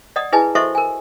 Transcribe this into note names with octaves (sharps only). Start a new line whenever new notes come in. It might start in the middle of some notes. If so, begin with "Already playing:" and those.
D5 D#5 F#5 D#6
E4 G#4 B4 D#5 G#5 A5
F#4 A4 C5 D#5 E5 C#6
A#4 G#5